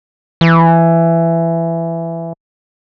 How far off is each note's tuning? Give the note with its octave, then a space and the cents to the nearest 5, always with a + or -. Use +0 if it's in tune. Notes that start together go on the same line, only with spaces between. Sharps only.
E3 +15